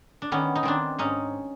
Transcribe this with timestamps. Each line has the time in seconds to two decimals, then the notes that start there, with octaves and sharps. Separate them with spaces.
0.22 D4
0.32 D#3 B3 C#4
0.55 D#4
0.63 D#3 C4 D4
0.99 G#2 C#4 D#4